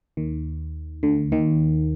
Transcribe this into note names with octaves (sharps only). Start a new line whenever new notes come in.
D#2 D#3
D2 D3
D#2 D#3